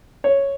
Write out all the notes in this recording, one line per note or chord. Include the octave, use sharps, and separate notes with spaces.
C#5